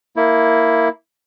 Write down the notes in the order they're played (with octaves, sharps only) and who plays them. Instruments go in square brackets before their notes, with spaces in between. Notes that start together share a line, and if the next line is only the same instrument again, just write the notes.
[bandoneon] A#3 E4